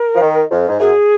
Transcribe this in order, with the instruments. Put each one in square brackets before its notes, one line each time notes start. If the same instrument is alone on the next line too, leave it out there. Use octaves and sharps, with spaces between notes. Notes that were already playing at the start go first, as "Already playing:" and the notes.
Already playing: [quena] A#4
[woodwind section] F3
D#3
F2
G#2
[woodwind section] F#2 [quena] G#4